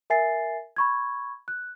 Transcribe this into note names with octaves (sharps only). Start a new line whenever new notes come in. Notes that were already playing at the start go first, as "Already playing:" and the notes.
A#4 E5 G#5 A6 C7
B5 C#6 G#6
F#6